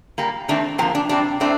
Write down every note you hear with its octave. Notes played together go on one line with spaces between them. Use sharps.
A#2 G3 A#3
D#3 A3 C4 D4
C3 F3 A#3 C4
D4
C3 G3 C4 D4
A2 A3 C4 D4